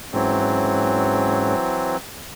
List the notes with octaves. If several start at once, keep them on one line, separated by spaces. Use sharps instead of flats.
G#2 E3 F#3 C4 C#4